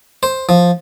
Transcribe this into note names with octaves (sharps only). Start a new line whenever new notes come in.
C5
F3